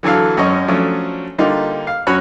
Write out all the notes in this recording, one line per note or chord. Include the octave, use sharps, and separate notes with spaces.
D3 E3 F#3 A4 F5
G#1 F#2 C#4 D#5 C#6
F3 F#3 A3 C#4 D4
D3 G3 A#3 D#4 F4
F5
F#2 C#4 F#4 C#5 B5 F#6